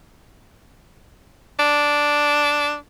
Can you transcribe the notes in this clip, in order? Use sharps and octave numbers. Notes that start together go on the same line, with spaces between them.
D4